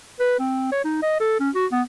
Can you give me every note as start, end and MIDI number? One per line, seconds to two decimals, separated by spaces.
0.20 0.36 71
0.39 0.67 60
0.72 0.83 73
0.84 1.00 63
1.02 1.18 75
1.20 1.38 69
1.40 1.50 61
1.55 1.66 66
1.72 1.82 59